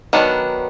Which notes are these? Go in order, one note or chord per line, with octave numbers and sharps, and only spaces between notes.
D#3 F#3 B3 D4